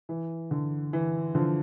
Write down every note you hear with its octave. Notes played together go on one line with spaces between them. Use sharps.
E3
D3
E3
D3 F3